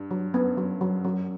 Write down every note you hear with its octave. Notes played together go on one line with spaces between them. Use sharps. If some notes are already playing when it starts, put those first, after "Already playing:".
Already playing: G2
F#3
F#2 B3
F#3
F#3
F#2 F#3